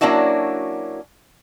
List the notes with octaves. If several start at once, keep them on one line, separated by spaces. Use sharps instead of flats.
F#3 A#3 C#4 D4 E4 F#4